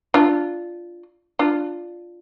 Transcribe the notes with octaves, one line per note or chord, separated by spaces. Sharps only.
D4 F4
D4 F4